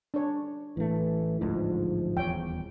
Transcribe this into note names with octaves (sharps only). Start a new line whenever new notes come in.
D4 C#5
A1 E3 A3
A1 D2 G#2 F3
D#1 E2 C#5 G5